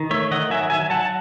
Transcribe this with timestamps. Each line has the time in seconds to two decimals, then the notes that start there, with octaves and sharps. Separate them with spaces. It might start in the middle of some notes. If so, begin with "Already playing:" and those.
Already playing: D#3
0.11 A3 C#5 E5
0.31 D#3 D#5 F#5
0.50 F#3 E5 G#5
0.70 F#3 E5 G#5
0.90 F#3 F#5 A5